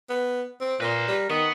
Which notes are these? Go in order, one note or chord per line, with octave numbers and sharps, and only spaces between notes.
B3
C4
A#2 A#4 B4 C6
G3
D#3 B3 D#6